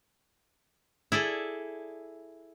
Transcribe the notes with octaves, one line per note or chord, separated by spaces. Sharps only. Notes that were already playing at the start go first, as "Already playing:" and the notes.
E4 G#4 A4 D5